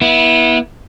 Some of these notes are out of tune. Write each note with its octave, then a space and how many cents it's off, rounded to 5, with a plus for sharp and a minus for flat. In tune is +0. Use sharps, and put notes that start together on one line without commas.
B3 -30 E4 -15